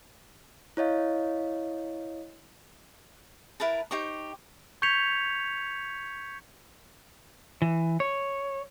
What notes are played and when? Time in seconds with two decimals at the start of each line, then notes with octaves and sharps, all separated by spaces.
0.77 E4 C#5 D#5 F5
3.60 E4 A#4 B4 A5
3.91 D#4 G4 C5 C#6
4.82 C#6 G6 G#6 B6 C#7 F7
7.62 E3
8.00 C#5